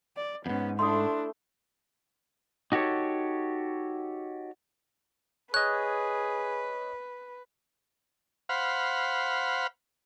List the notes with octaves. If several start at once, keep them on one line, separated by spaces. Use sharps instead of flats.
D5
F2 G#2 B3 C#4
A3 D4 E4 C5 C6 D#6
D#4 F#4 G4 A4 C#5
G#4 B4 C#5 D#5 F#6
C5 F5 F#5 B5